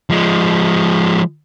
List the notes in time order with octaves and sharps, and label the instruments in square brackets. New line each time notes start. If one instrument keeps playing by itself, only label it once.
[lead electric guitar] F3 G#3